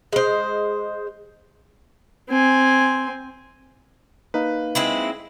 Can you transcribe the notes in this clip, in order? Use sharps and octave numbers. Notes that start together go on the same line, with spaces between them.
G#3 C5
C4 G#5
A#3 D#4 B4 F5
G#3 C4 E4